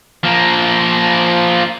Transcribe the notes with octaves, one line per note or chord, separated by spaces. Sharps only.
F3 A#3